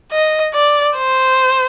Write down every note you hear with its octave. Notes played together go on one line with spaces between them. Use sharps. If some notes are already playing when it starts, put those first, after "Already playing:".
D#5
D5
C5